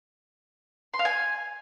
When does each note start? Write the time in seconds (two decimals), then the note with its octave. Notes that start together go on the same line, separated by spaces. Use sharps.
0.94 C6
0.99 F5
1.05 G#5